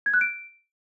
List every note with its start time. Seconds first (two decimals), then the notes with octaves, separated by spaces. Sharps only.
0.06 G#6
0.14 F#6
0.21 D7